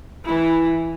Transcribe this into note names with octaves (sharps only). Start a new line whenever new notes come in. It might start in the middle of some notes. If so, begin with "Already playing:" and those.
E3 E4